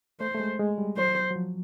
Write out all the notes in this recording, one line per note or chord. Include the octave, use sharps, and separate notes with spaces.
A3 C5
A3
G#3
G#3
G3
F#3 C5
F#3
F3